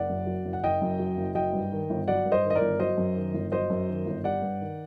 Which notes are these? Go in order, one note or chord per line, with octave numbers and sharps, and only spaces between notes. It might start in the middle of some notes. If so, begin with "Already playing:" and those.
Already playing: F#1 D5 F#5
F#2
F#3
F#1
F#5
F#1 D#5 G5
F#2
F#3
F#1
F#3 D#5 G5
G2
D#3
G1
F#3 D5 F#5
G2
C5 D#5
D#3
D#5
A#4 D5
G1
F#3 C5 D#5
F#2
D#3
G1
F#3 C5 D#5
F#2
D#3
G1
G3 D5 F#5
G2
D#3